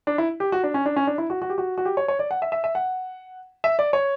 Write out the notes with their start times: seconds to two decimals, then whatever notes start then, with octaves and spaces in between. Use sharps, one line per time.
0.07 D4
0.18 E4
0.40 G4
0.52 F#4
0.63 D4
0.74 C#4
0.86 D4
0.96 C#4
1.07 D4
1.18 E4
1.30 F#4
1.42 F#4
1.50 G4
1.58 F#4
1.78 F#4
1.85 G4
1.97 C#5
2.08 C#5
2.19 D5
2.31 F#5
2.42 E5
2.52 E5
2.64 E5
2.75 F#5
3.64 E5
3.79 D5
3.93 C#5